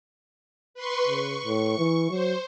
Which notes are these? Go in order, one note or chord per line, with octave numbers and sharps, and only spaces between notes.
B4 C6 C#6
C#3 C#6
A2
E3
F#3 C5